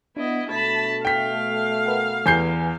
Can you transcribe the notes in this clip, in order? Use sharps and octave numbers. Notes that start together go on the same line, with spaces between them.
B3 D4 E4 D#5
B2 A3 A5 B5
F5 G5 B6
A#4 B4 F#5
E2 G4 B4 G#5 G6 C7